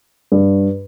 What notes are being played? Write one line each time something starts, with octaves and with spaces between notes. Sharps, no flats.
G2